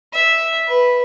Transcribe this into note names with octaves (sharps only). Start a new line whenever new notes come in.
E5
B4